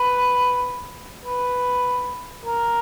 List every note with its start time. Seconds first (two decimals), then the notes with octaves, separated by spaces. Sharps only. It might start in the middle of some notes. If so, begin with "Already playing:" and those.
Already playing: B4
1.25 B4
2.45 A#4